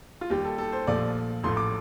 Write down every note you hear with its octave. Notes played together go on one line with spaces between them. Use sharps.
F4
D#2 D#3 G3 G4
A4
A4
C5
A#1 A#2 F3 A3 D5
A1 A2 F3 A3 C6
D6